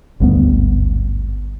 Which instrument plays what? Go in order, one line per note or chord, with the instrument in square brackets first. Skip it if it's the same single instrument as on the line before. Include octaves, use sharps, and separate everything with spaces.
[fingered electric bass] G#1 D2 G2 B3